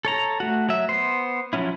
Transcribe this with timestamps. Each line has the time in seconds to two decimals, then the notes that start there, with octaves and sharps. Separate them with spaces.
0.05 A4 C#5 A#5
0.40 A3 F#4
0.69 F#3 E5
0.89 B3 C5
1.53 F3 F#3 C#4 E4